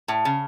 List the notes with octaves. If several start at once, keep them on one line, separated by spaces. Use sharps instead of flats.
A2
C#3